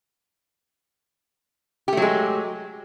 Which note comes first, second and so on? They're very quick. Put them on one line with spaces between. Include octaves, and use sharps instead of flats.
G4 A3 F#3 G#3